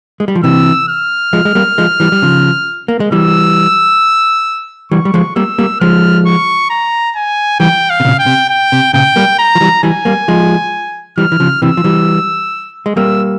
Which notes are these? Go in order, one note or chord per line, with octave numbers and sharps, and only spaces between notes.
G#3
G3
F3
C3 E3 E6
F6
F3 G#3
G#3
G3 A#3
F3 G#3
E3 G3
G3
C#3 F3
A#3
G#3
E3 G3 E6
E3 G3 C#6
G3
F3 G#3
G3 A#3 E6
G3 A#3
F3 G#3 F6
C#6
A#5
G#5
E3 G3 G5
F5
C3
A#2 C#3
G5
C3
G5
C3
A#2 C#3 G5
G3 A#3
A#5
F3
E3 G3
E3 G3 G#5
G3 A#3
F3 G#3
E3 G3 F6
E3
C#3 F3
C3 E3 E6
F3
E3 G3
G#3
G3 A#3 E6